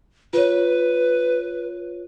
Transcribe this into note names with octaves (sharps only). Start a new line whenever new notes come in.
F4 B4 C#5